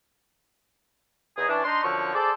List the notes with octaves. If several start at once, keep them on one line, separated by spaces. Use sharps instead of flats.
E2 D#4 G#4
E3 C#4 D4
D4 D#4 C6
F#2 D3 F3 C#6
G#4 A4 C5 D5